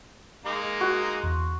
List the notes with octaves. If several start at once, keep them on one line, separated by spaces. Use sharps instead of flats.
G#3 A#3 D#4 A#5
F#4
E2 C6